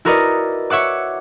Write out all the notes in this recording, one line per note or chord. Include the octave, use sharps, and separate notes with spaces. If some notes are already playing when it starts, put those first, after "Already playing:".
E4 F#4 A#4 B4 D5 D#5
C#5 E5 F#5 D6